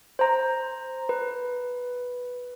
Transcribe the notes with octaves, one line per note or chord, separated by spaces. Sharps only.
C5 A#5
B4